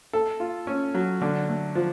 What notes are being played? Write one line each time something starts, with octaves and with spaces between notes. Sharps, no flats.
A4
F4
C#4
F#3
D3
A3
F3